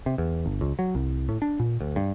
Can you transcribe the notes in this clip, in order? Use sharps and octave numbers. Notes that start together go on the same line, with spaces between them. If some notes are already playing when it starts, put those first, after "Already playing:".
C3
E2
G1
C#2
F#3
C2
A2
D4
A#2
D2
G2